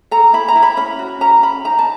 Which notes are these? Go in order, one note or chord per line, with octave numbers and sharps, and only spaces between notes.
A4 A#5
E4 B5
A#5
E4
B5
C#4 B5
F#4
C#4 A#5
C#4 B5
D#4 A#5
A5